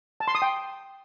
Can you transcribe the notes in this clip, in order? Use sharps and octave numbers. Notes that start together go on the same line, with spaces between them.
A5
C6
D#6
G5